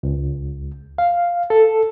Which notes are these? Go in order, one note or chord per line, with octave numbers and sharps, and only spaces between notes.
C#2
F5
A4